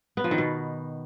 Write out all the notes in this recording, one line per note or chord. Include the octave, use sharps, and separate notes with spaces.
B3
F3
D#3
B2